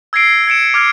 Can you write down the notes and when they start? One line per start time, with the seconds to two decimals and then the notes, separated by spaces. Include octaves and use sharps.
0.13 E6 G#6 A#6 C7 D7
0.47 G#6 C#7 D7 E7
0.74 D6 F6 G#6 D7